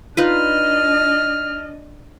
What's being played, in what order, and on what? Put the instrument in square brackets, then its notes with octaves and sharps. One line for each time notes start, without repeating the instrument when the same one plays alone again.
[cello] D4 D#5 [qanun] D#4 F4 B4 [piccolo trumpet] F6